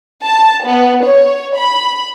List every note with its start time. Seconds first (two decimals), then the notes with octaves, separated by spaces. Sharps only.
0.23 A5
0.65 B3
1.04 C#5
1.57 B5